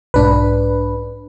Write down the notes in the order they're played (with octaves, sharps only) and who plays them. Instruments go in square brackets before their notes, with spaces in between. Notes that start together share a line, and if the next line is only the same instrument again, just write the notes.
[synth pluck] B1 G#2 [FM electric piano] D4 B4